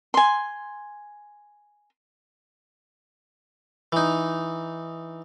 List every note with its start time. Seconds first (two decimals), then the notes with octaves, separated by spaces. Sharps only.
0.14 G#5 C6
3.92 E3 D#4